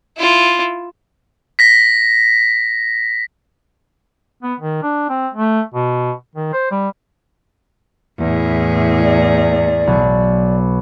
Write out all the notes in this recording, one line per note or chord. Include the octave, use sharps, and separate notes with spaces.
E4 F4
A#6 B6
B3
D#3
D4
C4
A3
B2
D#3
C5
G3
E2 A2 G#4
D5
B1